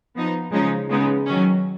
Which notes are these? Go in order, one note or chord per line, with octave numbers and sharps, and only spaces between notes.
F3 B3 D#4
C#3 F3 G#3 D#4
C#3 G#3 B3 D#4
D#3 F#3 C#4